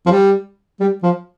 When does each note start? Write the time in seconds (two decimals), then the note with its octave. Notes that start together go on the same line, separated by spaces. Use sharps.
0.06 F3
0.11 G3
0.80 G3
1.03 F3